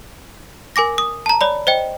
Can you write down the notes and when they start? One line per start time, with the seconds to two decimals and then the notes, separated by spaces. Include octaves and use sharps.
0.76 A#4 G#5 D6 A#6
0.98 D#6
1.26 A5 A#5
1.41 C#5 D5 B5
1.67 C5 D#5 G5